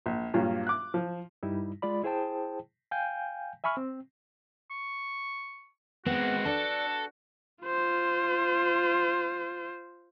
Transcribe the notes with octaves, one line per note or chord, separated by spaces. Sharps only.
A#1
G2 A#2 F#3 F4
D6 F#6
F3
G2 G3 D#4 E4
G#3 F4 D5 B5
E4 G#4 C5 G5 A5
F5 G5 G#5 G6
E5 G#5 B5 C#6 F6
C4
C#6
G#3 B3 C4 F#4
D4 A4
F4 C5